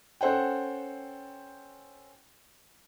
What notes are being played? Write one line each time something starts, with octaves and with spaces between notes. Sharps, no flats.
C#4 A4 C5 F#5 G5